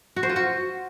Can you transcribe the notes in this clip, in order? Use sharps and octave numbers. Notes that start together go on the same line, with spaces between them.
F#4
C5
F4
F#4